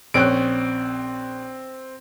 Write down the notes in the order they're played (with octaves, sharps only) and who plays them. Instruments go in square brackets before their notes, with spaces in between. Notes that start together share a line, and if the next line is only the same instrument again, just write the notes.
[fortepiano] A#1 C#4 F#6 [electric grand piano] C4 D7